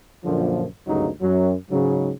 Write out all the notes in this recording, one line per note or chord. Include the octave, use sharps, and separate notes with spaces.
A#1 F#2 A#2 D3 F3
G#1 D2 G2 C#3 F#3 D#4
F#2 F#3
G#2 C#3 F#3